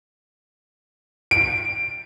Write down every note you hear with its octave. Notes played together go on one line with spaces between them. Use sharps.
D7